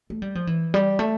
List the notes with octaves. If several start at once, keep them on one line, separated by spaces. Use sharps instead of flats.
A3
G3
F3
E3
G3
A3